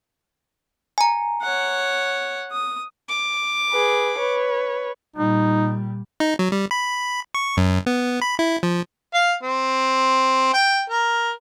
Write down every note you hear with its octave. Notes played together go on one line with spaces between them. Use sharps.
G#5 A#5
C#5 F#5
D#6
D6
G#4 B4
B4 C#5
A#2 G3 D#4
D#4
F#3
G3
B5
C#6
F#2
B3
B5
E4
F3
F5
C4
G5
A#4